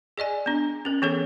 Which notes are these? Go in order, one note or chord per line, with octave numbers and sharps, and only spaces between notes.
G#4 D5 D#5 G#5
B3 D4
C#4 A#4
E3 B3 G#4 A4 C#5